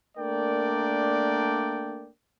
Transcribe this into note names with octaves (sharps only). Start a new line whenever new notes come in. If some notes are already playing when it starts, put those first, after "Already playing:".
A3 A#3 D4 A#4 D5 G5